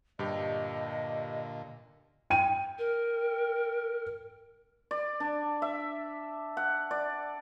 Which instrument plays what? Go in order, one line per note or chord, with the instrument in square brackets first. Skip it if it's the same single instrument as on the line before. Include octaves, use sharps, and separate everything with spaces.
[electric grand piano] G2 G4 [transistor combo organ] A#2 D3 [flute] D#5
[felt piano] G5 D#7
[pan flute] A#4
[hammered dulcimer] D5
D4
E5
F#5
D5